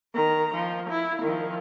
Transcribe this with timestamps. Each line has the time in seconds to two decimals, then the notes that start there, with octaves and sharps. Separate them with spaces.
0.14 D#3 A#5
0.54 F3
0.90 E4
1.22 D#3 F3